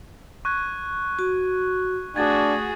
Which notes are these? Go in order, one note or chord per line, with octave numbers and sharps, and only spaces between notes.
C#6 F#6 G#6
F#4
A3 D4 F#4 G#4 G#6 A6